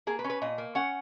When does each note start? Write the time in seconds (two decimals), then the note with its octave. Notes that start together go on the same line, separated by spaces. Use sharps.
0.07 A#3 G#4
0.19 B4
0.24 C#4
0.30 B4
0.42 A#2 D#5
0.58 A#3
0.75 C#4 F#5